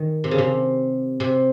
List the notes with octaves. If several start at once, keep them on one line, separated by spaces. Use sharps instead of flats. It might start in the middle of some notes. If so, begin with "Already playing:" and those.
Already playing: D#3
C3
C#3
C3
C3